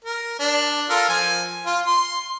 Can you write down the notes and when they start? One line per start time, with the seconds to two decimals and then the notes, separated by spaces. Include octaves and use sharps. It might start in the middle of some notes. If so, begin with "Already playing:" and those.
0.05 A#4
0.40 D4
0.90 F4 A4 A#4
1.09 F3 G#5
1.66 F4
1.87 C6